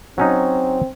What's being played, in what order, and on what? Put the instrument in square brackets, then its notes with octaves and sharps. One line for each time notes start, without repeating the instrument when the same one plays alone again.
[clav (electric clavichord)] F#3 C#4 D#4 [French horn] C4